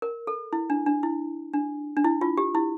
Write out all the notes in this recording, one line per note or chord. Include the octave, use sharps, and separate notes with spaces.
A#4
A4
E4
D4
D4
E4
D4
D4
E4
F4
G4
E4